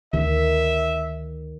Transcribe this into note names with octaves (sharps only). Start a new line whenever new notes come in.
D2 D#3 E5